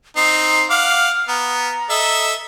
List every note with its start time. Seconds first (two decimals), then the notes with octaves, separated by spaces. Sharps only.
0.16 C4 D#4 C7
0.70 F5 F#5 D6 F6
1.28 B3 A#5
1.90 A4 D#5 E5